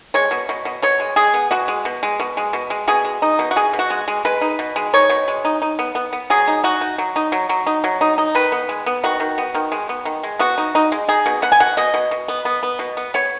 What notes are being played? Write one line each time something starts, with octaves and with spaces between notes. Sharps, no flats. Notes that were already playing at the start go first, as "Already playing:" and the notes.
G#3 C#5
B2
B2
B2
B2 C#5
G#3
G#3 G#4
B3
B2 F#4
G#3
B2
G#3
B2
G#3
B2
G#3
B2 G#4
G#3
D#4
B2
F#4
B2 G#4
B2
F#4
G#3
G#3
G#3 B4
D#4
B2
G#3
D#4 C#5
B2
G#3
D#4
D#4
B3
B3
B3
F#3 G#4
D#4
D#4 F#4
D#4
F#3
D#4
F#3
F#3
D#4
F#3
D#4
D#4
D#3 B4
B3
G#3
B3
D#3 F#4
D#3
B3
D#3
G#3
B3
D#3
G#3
B3 F#4
D#4
D#4
G#3
D#4 G#4
B2
B3 F#5
G#5
B2 F#5
B2 D#5
B2
B2
B3
B3
B3
B2
B3
B3 C#5